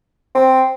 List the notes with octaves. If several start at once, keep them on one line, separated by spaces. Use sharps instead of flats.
C4